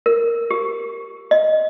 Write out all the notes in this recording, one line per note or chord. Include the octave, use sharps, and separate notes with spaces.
A#4
G4
D#5